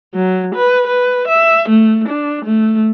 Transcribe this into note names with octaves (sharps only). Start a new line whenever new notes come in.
F#3
B4
B4
E5
A3
D4
A3